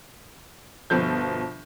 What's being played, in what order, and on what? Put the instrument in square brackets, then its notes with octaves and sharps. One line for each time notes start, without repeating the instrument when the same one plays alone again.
[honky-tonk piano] G1 B2 F3 G6